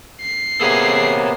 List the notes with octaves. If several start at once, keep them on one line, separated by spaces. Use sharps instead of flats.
C7
C3 A#3 B3 G#4 A4 C#5 G#5